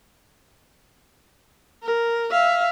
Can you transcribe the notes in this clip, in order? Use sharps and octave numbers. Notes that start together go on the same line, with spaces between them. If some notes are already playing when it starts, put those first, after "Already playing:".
A#4
E5 F5